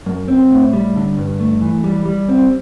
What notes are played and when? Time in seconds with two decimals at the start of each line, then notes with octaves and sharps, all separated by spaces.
0.06 F#2
0.28 C4
0.51 A2
0.73 G3
0.95 D3
1.17 G2
1.40 A3
1.61 E3
1.84 G3
2.05 G3
2.28 C4